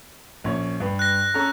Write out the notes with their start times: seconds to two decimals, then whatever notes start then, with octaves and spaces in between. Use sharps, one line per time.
0.44 A#1 C#4 C#5
0.80 G2 B4
0.99 F#6 A#6
1.34 C#4 A4 A#5